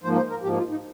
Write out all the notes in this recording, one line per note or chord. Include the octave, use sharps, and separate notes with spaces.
G#2 F3 A#3 C5
C5
A#4
G#2 F3 A#3 G4
F4
D#4